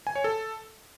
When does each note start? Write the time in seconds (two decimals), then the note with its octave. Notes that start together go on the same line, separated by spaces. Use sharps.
0.07 G#5
0.15 C#5
0.24 A4